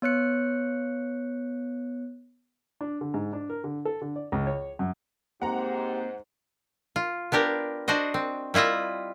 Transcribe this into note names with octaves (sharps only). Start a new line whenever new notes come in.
B3 C#5 F#6 C#7
D4
D3
G#2
D4
A#4
D3
A4
D3
D5
C#2
C#5
F#2
G#2 A#3 C4 G4 C5 F#5 A#5
F4
B3 D4 G4 A#4
D4 F#4 C5 D#5
C4
G3 E4 F4 D#5 E5